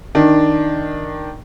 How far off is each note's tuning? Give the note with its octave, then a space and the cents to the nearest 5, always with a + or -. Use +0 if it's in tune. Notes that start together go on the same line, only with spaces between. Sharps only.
D#3 +0 D4 +0